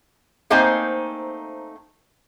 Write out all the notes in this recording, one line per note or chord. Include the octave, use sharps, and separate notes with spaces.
A3 A#3 C4 D#4 C5 G#5